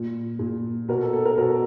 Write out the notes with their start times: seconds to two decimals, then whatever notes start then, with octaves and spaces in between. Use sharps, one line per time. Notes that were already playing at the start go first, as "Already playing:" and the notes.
Already playing: A#2
0.39 A#2
0.88 B2 A#4
1.01 A4
1.13 A4
1.25 A#4
1.38 B2 A#4